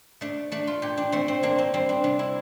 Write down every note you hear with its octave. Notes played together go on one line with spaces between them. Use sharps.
A3 D4
A3 D4
F4
A#2 G4
D4
A3 C4
C4
A#3 D4
C4
G3 C4
D4
C3 D4
E4